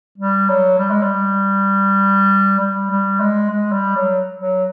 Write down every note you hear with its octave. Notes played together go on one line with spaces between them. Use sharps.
G3
F#3
G3
G#3
G3
G3
G3
G#3
G#3
G3
F#3
F#3